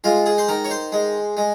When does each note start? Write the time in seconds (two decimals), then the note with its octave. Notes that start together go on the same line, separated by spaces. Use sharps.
0.04 G#3 F4
0.26 G#4
0.38 C5
0.48 D#3 A#4
0.65 C#5
0.71 C5
0.92 G#3
1.37 G#3